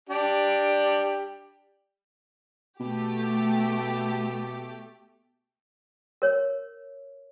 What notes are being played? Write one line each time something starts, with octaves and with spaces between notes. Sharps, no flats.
D4 G4 D5
B2 A3 G4
A#4 C#5